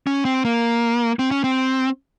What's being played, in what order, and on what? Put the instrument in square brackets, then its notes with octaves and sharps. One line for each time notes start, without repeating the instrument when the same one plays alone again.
[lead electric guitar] C#4
C4
A#3
C4
C#4
C4